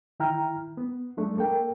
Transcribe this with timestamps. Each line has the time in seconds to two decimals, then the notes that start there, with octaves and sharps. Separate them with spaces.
0.20 D#3 E4 G5 A#5 F6
0.77 B3
1.17 F#3 G#3 A3 D4
1.37 A#3 A4 A#4 G5